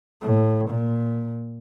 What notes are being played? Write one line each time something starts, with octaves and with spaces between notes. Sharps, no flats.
A2
A#2